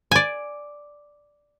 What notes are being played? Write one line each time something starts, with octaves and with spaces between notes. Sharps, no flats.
D5 G#5